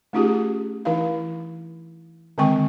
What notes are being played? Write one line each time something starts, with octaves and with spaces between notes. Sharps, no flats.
A3 C#4 D#4 F4 G4 G#4
E3 D#4 E4 F5
D3 D#3 G#3 C4 G5 C#6